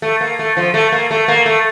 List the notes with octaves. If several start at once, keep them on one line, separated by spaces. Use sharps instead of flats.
A3
A#3
A3
F3
A3
A#3
A3
A#3
A3